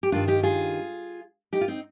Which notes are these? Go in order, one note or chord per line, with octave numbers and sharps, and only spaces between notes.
G4
G2 D#3 D4 F4
D#4 G4
F4 G#4
D#4 G4
F4
C4 D#4